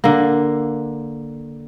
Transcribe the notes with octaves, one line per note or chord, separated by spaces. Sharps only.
D3 A#3